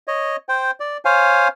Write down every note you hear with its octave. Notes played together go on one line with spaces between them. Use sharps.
C#5 D#5
C5 G5
D5
C5 C#5 F5 G#5